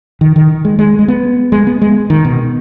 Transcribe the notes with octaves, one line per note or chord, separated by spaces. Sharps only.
D#3
D#3
G#3
G#3
G#3
B3
G#3
B3
G#3
D#3
B2